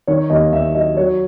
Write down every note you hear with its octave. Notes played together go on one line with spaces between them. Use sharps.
D#3 C#5
D#2 D#5
D#2 E5
F#3 D#5
F#3 C#5